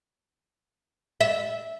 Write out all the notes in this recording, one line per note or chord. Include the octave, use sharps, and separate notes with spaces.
E5